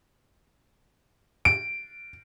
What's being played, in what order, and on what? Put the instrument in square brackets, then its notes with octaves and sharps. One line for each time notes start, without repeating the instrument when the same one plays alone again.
[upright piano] D7